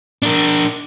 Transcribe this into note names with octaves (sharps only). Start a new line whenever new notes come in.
D4 A#4